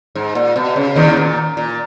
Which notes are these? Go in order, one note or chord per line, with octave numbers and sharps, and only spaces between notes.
G#2
A#2
B2
C#3
D#2 D#3
A#2
A#2